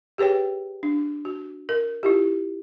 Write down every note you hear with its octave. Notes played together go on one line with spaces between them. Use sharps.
G4 G#4 B4 C#5 G5
D4
F#4
A#4
E4 F4 G4